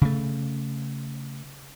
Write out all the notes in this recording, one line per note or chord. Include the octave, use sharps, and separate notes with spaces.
C#3 A3